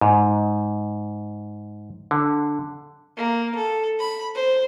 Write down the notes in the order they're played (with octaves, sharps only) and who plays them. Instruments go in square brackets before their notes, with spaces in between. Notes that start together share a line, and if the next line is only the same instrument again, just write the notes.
[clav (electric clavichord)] G#2
D3
[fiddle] A#3
A4
B5
C5